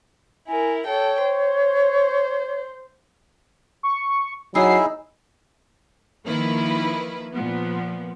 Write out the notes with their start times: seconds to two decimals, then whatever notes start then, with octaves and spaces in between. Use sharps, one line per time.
0.48 E4 A#4 G#5
0.86 A4 C#5 G5
1.25 C5
3.83 C#6
4.55 F#3 D#4 E4 G#4 E5 C7
6.26 D#3 F3 A#3 E4 B4
7.33 A#2 F3 B3